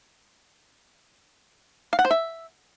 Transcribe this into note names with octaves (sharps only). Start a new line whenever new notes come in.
F5
F#5
C5
E5